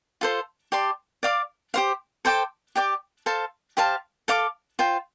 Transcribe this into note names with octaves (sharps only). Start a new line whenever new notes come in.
F4 A4 C5
G4 D5 A5 C6
D5 F5 D6
G4 C5 F5
A4 C5 G5 D6
G4 D5 G5 D6
A4 C5 F5 A5
G4 C5 F5 A5
A4 F5 D6
F4 C5 G5